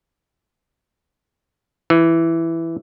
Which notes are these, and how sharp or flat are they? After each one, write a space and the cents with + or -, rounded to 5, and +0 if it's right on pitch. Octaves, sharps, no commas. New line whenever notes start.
E3 +5